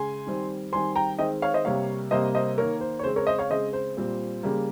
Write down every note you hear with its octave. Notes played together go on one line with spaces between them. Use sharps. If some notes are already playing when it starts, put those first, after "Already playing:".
Already playing: C#3 G#3 G#5 C6
D#3 G3 C4
D#3 G3 C4 G#5 C6
G5 A#5
D#3 G#3 C4 D#5 G5
C#5 F5
C5 D#5
C3 G3 A#3 C#5 F5
C3 G3 A#3 C5 D#5
C5 D#5
D#3 A#3 A#4 C#5
C5
C#5
C#3 G#3 C4 C5
A#4 C#5
C5 D#5
C#5 F5
C#3 G#3 C4 C5 D#5
C5
A#2 G3 C4
C#3 G3 A#3